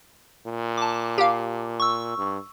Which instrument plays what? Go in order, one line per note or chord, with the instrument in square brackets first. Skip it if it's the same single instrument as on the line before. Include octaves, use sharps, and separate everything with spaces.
[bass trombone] A#2
[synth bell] A5 D6
[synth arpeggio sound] G4 F5
[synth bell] C#6 E6
[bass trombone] G2